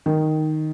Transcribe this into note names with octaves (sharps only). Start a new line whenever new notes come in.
D#3